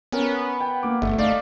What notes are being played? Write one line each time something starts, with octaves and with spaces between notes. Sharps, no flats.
B3 C#4 A#4
G5
A#3 D6
G1 A3
A3 D#4 D5 F5